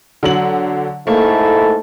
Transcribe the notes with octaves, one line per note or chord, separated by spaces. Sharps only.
D3 F#3 F#7
G#2 A3 A#3 E4 A4